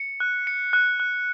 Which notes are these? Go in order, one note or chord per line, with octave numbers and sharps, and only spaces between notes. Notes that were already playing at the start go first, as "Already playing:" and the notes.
Already playing: C#7
F#6
C#7
F#6
F#6